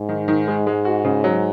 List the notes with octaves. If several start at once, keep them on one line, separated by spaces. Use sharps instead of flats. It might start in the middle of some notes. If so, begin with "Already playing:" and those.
Already playing: G#2
D#3
D#3
G#3
G#3
F#4
C#3
F#3